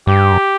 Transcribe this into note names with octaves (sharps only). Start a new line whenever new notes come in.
G2 G4
F#2